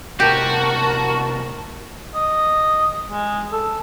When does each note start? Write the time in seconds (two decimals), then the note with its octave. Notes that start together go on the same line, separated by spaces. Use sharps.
0.20 A2 C3 F#4 G4 A#4 A5
2.15 D#5
3.08 G#3
3.53 A4